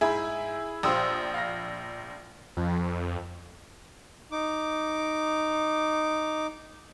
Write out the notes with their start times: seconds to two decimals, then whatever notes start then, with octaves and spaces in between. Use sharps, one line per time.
0.01 G#2 E4 G#4 B5
0.83 A#1 G4 C5 F5 D#6 E6
1.34 F5 A#6
2.57 F2
4.32 D#4 D6